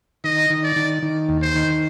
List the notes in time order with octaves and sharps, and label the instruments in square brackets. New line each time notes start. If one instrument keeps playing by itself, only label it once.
[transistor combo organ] D#3 [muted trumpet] D#5
[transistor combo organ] D#3
[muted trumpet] D5
[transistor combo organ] D#3
D#3
D#2
[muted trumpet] C5
[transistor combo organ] D#3